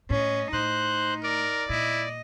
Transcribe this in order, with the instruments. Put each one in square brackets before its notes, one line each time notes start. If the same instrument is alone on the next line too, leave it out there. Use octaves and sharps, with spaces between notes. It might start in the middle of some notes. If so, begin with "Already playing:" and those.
[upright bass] A2 [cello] C#4 D#5
[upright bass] A2 [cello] D#4 [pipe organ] C5 F#6
[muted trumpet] A#4 [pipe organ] D5
[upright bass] A#2 [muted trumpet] E4 [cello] D#5